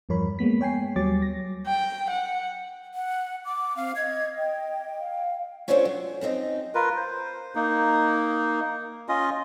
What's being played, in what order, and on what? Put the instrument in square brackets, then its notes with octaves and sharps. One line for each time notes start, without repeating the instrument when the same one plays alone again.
[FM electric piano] E2 G2 F3 A#4 C#5 B5
G#3 A#3 B3 B6
C#5 G5 G#5 C7
D#2 F#3 G3 C#5 D6 A6
A#6
[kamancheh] G5
F#5
[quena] F#5
D6
[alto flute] C4 [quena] F5
[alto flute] D#5 [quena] G#6
[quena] G5
[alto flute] F5
[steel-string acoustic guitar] C#4 D4 F4 A4 C5 C#5
F#3
F#2 C4 D#4 D#5
[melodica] F4 A#4 B4
C5
A#3 D#4
C#4 F4 D#5